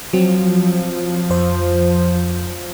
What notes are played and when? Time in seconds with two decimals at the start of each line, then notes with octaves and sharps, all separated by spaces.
0.13 F3 F#3 C4
1.30 F2 C5